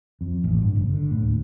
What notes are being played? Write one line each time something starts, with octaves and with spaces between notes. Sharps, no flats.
F2
A1
G2
F#1
D3
A2
D2